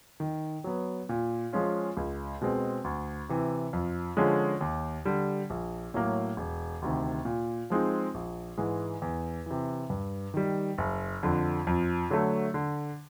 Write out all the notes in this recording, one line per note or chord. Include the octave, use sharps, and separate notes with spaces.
D#3
F#3 B3
A#2
F3 G#3 C#4 F4
C#2
B2 G#3 C4
D2
C3 E3
F2
D3 F3 G#3 C#4
D#2
D3 G3
A#1
A2 F#3 A#3
E1
D2 C3 D#3
A#2
F3 G#3 C4 D#4
A#1
G#2 E3 G#3
E2
C3 E3
G2
D#3 G3
F#1
F2 D3
F2
D3 F#3 A3
D3